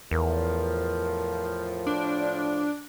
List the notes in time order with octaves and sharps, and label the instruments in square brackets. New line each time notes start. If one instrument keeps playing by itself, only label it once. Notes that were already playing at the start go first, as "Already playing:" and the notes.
[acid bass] E2 [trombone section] A2 F3 [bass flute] A#4
[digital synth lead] D4